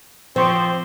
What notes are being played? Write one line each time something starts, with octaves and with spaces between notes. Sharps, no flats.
F3 C4 C5 C#6 D6